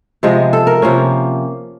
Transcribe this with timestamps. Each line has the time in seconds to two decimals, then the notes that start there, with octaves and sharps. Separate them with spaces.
0.23 C3 F3 G#3 B3
0.53 A4
0.67 A#4
0.82 C3 F3 A#3 C#4